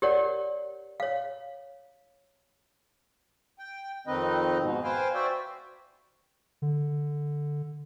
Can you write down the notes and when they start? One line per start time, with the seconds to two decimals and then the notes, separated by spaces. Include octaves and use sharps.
0.02 G4 A#4 C#5 D5 F#5
1.00 C#5 F5
3.59 G5
4.07 F2 D#3 C4 D#4 B4 D#5
4.59 G#2 B2
4.84 B4 C5 F5 G5 G#5
5.14 F#4 C5 D5 E5 G5
6.62 D3